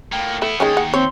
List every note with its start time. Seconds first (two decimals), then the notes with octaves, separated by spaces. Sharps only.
0.12 A2 A#3 G5
0.42 A3 B3 E4
0.60 D#2 D#3 G#3 C#4 G#4 G5
0.77 F#5
0.94 C4 C#5 C6